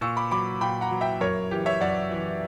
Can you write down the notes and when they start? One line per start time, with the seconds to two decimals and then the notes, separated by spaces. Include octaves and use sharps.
0.01 A#2 C#6 E6
0.17 B5 D6
0.31 F#3 B5 D6
0.61 A#2 G5 B5
0.81 F#5 A#5
0.91 F#3
1.01 E5 G5
1.21 F#2 A#4 C#5
1.51 E3 G4
1.66 C#5 E5
1.81 F#2 D5 F#5
2.11 E3